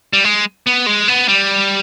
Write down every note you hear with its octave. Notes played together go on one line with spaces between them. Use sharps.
G3
G#3
B3
G#3
B3
G3